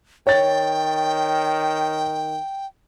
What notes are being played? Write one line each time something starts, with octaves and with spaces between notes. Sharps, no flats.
D#3 C#5 G5 A6